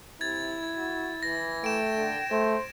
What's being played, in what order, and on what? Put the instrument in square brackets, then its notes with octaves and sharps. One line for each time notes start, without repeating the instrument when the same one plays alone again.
[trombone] C3 [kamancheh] E4 [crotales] G#6 A6
[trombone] F#4
[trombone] E3 [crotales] A#6
[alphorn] A3 [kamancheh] G5 [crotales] D7 E7
[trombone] D3
[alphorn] A3 [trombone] C5